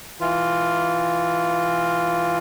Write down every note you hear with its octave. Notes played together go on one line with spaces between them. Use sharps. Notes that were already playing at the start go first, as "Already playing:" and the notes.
E3 F4